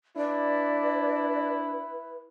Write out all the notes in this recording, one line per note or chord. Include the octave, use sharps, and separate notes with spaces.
D4 E4 B4 D5